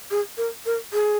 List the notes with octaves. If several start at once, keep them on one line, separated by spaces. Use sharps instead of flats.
G#4
A#4
A#4
G#4